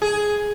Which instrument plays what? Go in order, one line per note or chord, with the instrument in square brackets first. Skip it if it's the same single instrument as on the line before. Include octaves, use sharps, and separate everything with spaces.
[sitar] G#4